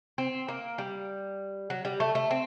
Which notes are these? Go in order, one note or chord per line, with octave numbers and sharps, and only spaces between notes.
C4
A#3
G3
F#3
G3
A3
A3
C4